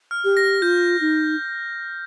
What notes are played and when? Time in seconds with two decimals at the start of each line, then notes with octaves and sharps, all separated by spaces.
0.11 F6
0.24 G4
0.37 A#6
0.62 F4 G6
1.01 D#4